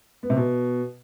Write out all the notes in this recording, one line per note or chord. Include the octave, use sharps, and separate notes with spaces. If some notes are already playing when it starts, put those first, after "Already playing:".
B3
C3
B2